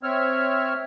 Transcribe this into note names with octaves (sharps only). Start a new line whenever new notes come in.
C4 C#5 E5 F6